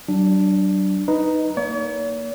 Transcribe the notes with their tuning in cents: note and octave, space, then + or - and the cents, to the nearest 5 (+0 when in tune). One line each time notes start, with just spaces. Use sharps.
F#3 +45 D4 +0
D#4 +0 B4 +0
A#3 +0 C#5 +45